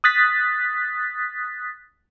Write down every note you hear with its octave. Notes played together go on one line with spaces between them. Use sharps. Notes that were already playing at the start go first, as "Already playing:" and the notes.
D#6 F#6 A6 B6